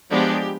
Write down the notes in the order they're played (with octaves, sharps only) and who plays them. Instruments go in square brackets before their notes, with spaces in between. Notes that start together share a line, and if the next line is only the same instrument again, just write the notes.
[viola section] F3 G#3 B3 D4 G4